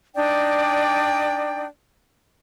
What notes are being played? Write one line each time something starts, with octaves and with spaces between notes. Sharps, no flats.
D4 D#4 D5 G5